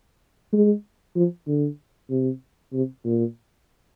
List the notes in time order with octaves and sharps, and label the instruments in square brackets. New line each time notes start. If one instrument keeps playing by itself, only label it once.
[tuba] G#3
F3
D3
C3
C3
A#2